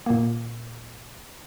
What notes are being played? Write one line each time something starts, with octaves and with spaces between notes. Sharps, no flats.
A#2 A#3